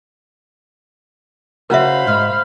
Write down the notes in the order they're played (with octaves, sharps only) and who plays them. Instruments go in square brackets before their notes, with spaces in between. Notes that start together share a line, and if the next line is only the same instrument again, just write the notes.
[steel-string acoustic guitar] C#3 F#4 A#5 [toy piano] A#4 E5 [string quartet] C5 F5 B5
[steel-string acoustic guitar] G#2 [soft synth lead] F6